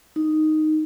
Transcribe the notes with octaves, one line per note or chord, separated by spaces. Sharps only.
D#4